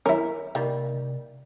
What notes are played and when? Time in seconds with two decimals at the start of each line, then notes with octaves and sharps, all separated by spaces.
0.06 C#4 E4 A#4
0.55 C3 D#3 G3 A#3